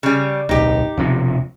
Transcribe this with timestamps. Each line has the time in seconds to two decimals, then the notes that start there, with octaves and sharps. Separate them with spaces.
0.03 C#3 G3
0.49 D1 B1 D#4 G4
0.97 E1 C3 F3